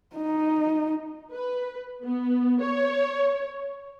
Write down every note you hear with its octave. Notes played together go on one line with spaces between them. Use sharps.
D#4
B4
B3
C#5